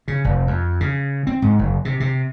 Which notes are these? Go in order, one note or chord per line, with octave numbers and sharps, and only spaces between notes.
C#3
F1
F2
C#3
C4
G#2
F#1
C3
C3